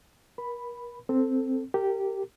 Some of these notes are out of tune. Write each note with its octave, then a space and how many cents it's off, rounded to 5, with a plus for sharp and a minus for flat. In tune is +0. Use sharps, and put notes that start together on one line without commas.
A#4 +35 B5 +0
C4 +0 A4 +10
G4 -10 A#4 -30